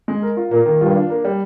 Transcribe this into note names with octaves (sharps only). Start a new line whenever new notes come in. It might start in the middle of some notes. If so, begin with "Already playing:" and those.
G#3
A#4
F4
A#2 A#3
D#3
G2 F4
D4
A#3
G3